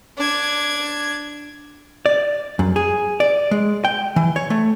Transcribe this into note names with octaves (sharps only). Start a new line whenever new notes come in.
D4 G#6
D5
F#2
G#4
D5
G#3
G5
E3
C#5
A3